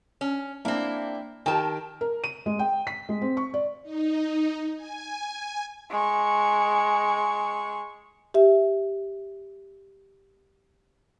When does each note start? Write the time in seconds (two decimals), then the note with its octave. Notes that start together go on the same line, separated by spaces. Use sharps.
0.21 C#4
0.65 A#3 C4 D4 E4
1.46 D#3 G4 A#4 G5 A5
2.01 A#4
2.24 D#7
2.46 G#3
2.59 G5
2.87 B6
3.09 G#3
3.21 C4
3.37 C#6
3.54 D5
3.83 D#4
4.76 G#5
5.90 G#3 C#6
8.34 G4 E5